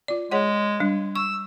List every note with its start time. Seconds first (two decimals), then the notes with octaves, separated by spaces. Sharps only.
0.08 F4 D5
0.31 G#3 G#4 C#5 F#5
0.80 G3 D4
1.16 C#6 E6